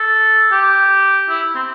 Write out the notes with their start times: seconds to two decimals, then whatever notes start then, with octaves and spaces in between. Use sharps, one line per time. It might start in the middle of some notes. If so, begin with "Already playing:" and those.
Already playing: A4
0.52 G4
1.29 E4
1.55 C4